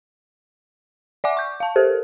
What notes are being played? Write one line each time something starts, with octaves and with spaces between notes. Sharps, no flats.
D5 E5 F#5 G#5 D6
C#6 G6
F5 A5
G4 A4 A#4 C5